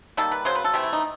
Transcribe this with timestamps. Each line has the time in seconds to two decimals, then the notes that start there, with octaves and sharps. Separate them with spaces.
0.17 D#3 G3 A#3 A4
0.32 B4
0.45 C#3 F#3 C5
0.55 B4
0.65 A4
0.74 C3 E3 A3 G4
0.83 E4
0.93 D#4